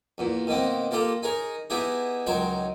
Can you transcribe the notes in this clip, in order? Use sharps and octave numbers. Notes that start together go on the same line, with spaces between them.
E2 A#2
B2 D#3 A#3 C4
A#3 F4 G4 A4 A#4
D#4 G#4 A#4 C#5
B3 D#4 E4 G4 G#4
C#2 D#3 F#3 C#5 G5 C6